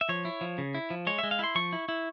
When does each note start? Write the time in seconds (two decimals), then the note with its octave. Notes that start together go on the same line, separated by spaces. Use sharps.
0.01 E5
0.09 F3 C#5
0.25 E4
0.41 F3
0.58 C#3
0.75 E4
0.90 F3
1.07 G#3 C#5
1.19 G#3 E5
1.31 F5
1.39 E4 C6
1.55 F3 C#6
1.73 E4
1.89 E4